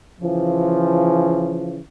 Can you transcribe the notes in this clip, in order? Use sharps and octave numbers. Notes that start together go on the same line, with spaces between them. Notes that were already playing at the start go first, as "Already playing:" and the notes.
C#3 E3 F3